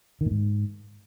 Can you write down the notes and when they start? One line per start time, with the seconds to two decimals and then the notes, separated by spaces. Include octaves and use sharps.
0.21 D#3
0.26 A2
0.31 G#2